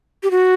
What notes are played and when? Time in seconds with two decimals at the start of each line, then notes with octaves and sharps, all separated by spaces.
0.23 G4
0.31 F#4